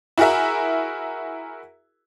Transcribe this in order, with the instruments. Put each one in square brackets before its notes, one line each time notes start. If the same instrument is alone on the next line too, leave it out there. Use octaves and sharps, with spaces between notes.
[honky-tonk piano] E4 F#4 G#4 A#4 E5